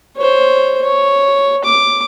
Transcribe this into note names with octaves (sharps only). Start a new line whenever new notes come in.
C5 C#5
C#5
D6